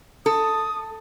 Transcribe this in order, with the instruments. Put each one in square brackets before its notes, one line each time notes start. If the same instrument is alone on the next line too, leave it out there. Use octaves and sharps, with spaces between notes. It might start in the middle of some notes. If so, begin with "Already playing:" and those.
[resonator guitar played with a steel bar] A4 [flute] D#6